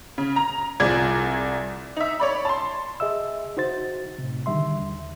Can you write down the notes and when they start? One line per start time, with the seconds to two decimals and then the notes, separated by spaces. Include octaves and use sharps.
0.18 C#3
0.36 A#5
0.80 C2 F3 G#4 D5 G#6
1.97 D#4 E5
2.20 C#5 D5 B5
2.45 A5 C6
3.00 G#4 D#5 E5 E6
3.57 D#4 F#4 C5 A6
4.19 A2 C3
4.46 D3 D#3 G3 E5 C6
4.81 D#2